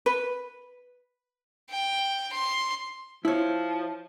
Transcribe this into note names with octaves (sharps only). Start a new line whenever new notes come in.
B4
G5
C6
F3 E4 C#5